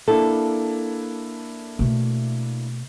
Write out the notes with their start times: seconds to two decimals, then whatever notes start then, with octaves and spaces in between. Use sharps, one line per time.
0.08 A#3 D4 E4 A4
1.79 B2 A3